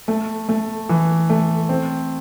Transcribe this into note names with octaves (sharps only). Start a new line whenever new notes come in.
A3
A3
E3
A3
C4